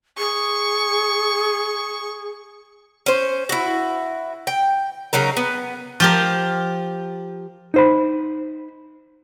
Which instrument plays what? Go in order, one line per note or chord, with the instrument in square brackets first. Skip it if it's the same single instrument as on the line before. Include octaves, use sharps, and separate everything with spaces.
[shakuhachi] G#4 [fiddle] C#6
[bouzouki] C#4 C5
E4 F#4
G5
C#3 F#3 D#4 A#4
B3
[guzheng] F3 G4 A#4
[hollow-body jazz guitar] D#4 C5 B5